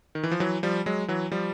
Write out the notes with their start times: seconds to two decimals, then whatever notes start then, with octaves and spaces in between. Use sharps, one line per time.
0.15 D#3
0.23 E3
0.31 F3
0.40 E3 F#3
0.63 F3 G3
0.86 F#3 G#3
1.08 E3 F#3
1.32 F3 G3